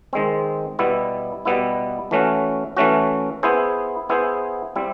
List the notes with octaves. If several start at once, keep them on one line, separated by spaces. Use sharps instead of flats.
D#3 G#3 C4
B2 G3 B3 E4
B2 G3 B3 E4
E3 A3 C#4 F#4
E3 A3 C#4 F#4
B3 E4 G#4 C5
B3 E4 G#4 C5
G3 C4 E4